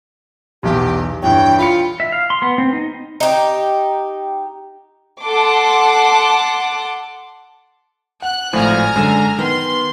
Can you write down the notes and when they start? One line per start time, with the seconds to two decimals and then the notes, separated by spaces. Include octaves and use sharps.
0.63 B1 E2 G4
1.23 G2 E3 C#5 G5
1.59 F4 B5 C#7
2.00 E5
2.12 F5
2.30 C6
2.42 B3
2.58 C4
2.73 D#4
3.20 D#4 G4
5.23 A4 F#5 A5 C6 D6
8.22 F#5 F#6
8.53 G#1 A2 F3 G#5 A#5 F6
8.96 F#2 D3 G#3 E7
9.39 D#3 B3 C6